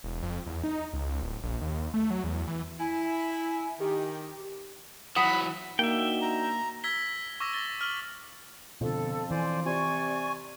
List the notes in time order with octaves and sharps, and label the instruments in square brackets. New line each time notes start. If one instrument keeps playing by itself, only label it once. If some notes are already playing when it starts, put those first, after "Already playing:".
[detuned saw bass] E1
F2
E2
D#4
C#2
D1
A#1
D#2
A3
F#3
E2
E3
[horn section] E4 [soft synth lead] G#5
[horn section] D#3 D#4 [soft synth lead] G4
[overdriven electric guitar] E3 F#3 [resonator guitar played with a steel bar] F#5 [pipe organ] B5 [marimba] D#6
[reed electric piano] A#3 [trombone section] D4 D#4 F#4 [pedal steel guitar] E5 G5
[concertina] A#5
[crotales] E6 G#6 A#6 B6 G7
C#6 D6 E6 A#6
A6 G7
F6 F#7 G7
[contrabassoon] F2 [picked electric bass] B2 D3 [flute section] A4
[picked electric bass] E3 [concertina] C5 D5 [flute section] G#5 C6
[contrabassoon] C3 [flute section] D5 C#6 [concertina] G#5